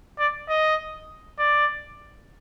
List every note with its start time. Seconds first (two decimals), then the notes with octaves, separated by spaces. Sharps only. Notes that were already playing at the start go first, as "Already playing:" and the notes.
0.19 D5
0.49 D#5
1.39 D5